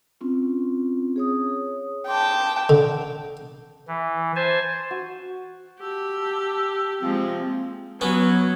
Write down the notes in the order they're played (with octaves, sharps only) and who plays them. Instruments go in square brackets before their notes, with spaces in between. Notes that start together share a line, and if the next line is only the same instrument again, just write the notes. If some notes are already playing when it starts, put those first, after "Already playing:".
[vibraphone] C4 C#4 F4
G#4 C#5 D#6
[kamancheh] G5 A5 [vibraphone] C6 D6
[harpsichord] D3
[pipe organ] E3
C5 G#5 A5
[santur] F#4
[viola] G4 [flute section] A5 E6
[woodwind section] C3 A#3 C4 [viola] F3 G#3
[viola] F#3 [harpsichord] B3 C#4